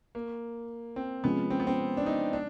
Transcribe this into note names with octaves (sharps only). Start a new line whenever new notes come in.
A#3
C4
C3 F3 G#3 B3 C#4 F4
C4
B3
C4
D4
D#4
D4